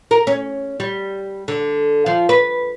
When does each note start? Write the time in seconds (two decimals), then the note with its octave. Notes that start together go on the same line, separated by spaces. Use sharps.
0.11 A#4
0.27 C#4
0.80 G3
1.48 D3
2.06 F3
2.29 B4